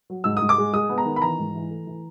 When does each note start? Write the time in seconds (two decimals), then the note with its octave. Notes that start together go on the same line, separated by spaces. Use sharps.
0.10 F#3
0.24 G#2 E6
0.37 D#6
0.42 G#2
0.49 D6
0.58 G#3
0.73 G#3 D#6
0.89 B3
0.98 A#5
1.06 D#3
1.16 B5
1.22 E3 A#5
1.39 G#2
1.55 E3
1.70 A3
1.87 E3